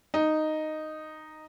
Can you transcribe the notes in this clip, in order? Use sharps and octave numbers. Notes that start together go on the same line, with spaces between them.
D#4